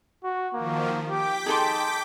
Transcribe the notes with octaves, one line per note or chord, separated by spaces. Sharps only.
F#4
D#3 F3 A#3
G4 G5 D6 B6
D#4 G#4 A4 C6